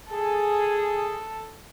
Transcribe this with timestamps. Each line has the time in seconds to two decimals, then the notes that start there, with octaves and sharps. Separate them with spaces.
0.11 G#4 A4